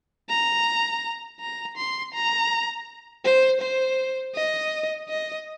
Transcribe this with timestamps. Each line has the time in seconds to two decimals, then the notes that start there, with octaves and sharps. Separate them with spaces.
0.30 A#5
1.40 A#5
1.77 C6
2.14 A#5
3.24 C5
3.61 C5
4.35 D#5
5.09 D#5